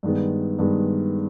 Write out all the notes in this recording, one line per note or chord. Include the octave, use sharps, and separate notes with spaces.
G2 D#3 G#3 B3
G2 D#3 G#3 B3